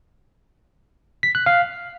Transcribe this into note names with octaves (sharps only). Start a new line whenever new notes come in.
B6
F#6
F5